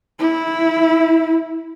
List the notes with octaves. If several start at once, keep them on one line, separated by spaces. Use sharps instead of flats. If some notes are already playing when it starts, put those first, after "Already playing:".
E4